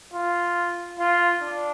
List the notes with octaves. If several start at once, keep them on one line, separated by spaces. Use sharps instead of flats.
F4
F4
D4